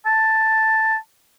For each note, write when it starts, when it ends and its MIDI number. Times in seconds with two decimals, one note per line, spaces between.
0.06 0.97 81